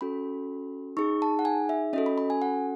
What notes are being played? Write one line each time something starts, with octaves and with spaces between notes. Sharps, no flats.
C#4 F#4 A4 B5
D#4 G#4 C#6
A5
F#5
G#5
E5
C#4 F#4 A4 D#5
B5
B5
G#5
F#5